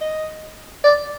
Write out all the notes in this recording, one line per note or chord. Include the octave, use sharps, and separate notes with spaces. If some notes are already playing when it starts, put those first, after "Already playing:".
D#5
D5